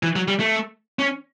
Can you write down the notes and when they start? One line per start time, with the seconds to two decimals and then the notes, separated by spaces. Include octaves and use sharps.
0.03 E3
0.16 F#3
0.28 G3
0.40 A3
0.99 C#4